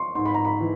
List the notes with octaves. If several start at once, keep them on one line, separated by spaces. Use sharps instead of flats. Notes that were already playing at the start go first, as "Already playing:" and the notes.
Already playing: C6 C#6
G#2 C6
B5
A#5
B5
E3